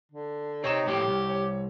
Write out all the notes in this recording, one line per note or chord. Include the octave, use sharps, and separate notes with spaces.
D3
C3 C4 D#4 C#5 C#6 E7
A2 F3 A#3 G4
C2
C#5